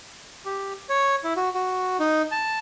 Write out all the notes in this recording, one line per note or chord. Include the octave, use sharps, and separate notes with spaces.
G4
C#5
E4
F#4
F#4
D#4
A5